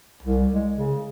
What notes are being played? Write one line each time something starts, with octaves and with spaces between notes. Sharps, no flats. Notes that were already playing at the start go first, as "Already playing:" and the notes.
C2
G#3
C#3